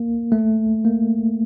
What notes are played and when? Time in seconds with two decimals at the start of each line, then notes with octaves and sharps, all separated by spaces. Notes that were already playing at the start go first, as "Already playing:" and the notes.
Already playing: A#3
0.32 A3
0.85 A#3